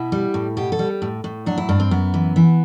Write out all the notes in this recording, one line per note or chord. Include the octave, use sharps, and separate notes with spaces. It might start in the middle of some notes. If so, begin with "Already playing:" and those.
Already playing: B2 E4
G3
A2
B2 G4
A4
G3
A2
A2
F#3 D4
E4
G2 D4
C4
F#2 B3
E3
E3